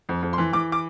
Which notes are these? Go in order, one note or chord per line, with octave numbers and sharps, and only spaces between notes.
F2
F2
C6
E3
E3 D6
D6